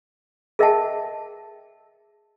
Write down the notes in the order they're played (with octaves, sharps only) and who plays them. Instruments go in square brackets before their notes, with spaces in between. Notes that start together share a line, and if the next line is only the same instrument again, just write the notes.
[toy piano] G#4 A#4 D#5 E5 G5 A5